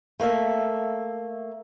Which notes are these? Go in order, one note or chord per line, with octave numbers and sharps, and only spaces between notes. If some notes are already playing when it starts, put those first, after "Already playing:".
A3 A#3 A4 E5